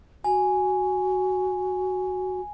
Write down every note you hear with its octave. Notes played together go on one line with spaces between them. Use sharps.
F#4 G#5